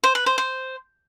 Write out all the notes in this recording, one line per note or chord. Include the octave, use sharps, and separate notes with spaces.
C5
B4
C5
C5